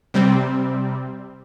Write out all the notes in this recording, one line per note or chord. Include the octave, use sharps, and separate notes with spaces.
C3 G3 C4